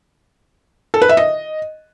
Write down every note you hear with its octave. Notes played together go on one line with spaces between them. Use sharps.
A4
B4
E5
D#5